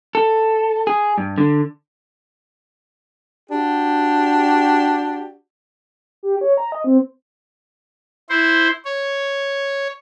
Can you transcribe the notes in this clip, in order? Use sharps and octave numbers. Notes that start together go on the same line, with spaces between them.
A4
G#4
G2
D3
D4 F#4 G4
G4
C#5
A#5
D#5
C4
E4 C5
C#5